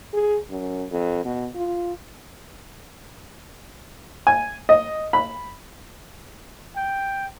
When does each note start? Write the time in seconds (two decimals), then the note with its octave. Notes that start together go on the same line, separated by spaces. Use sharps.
0.13 G#4
0.50 F#2
0.91 F2
1.25 B2
1.55 F4
4.27 G#5
4.69 D#5
5.13 B5
6.76 G5